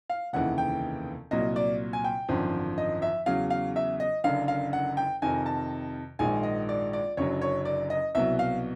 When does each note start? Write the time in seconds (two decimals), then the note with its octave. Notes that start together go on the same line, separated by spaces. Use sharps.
0.10 F5
0.33 F1 D#2 C#3 E3 F#5
0.58 G5
1.31 C2 A#2 F#3 D#5
1.56 D5
1.93 G#5
2.04 G5
2.29 G#1 F#2 D3 F3
2.78 D#5
3.02 E5
3.26 E2 C#3 F#3 F5
3.50 F5
3.76 E5
4.00 D#5
4.24 F#1 F#2 D3 F5
4.48 F5
4.73 F#5
4.97 G5
5.22 F2 C3 D#3 G#5
5.46 A5
6.19 A#1 G#2 D#3 G#3 G#5
6.43 D#5
6.69 D5
6.93 D5
7.17 F#1 F#2 D3 F#3 C#5
7.41 C#5
7.65 D5
7.90 D#5
8.15 C2 B2 F#3 E5
8.39 F5